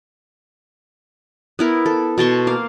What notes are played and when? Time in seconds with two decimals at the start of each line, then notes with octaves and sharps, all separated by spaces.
1.59 B3 E4 A#4
1.86 A4
2.18 B2 A5 C6 C#6
2.47 A#3 F5